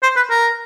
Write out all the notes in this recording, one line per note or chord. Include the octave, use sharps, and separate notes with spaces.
C5
B4
A#4